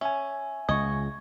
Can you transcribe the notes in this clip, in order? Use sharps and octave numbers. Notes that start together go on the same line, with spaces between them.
C#4 E5 G#5
C#2 D#5 C#6 G#6